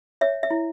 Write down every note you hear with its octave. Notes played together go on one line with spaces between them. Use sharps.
C#5 E5
E5
E4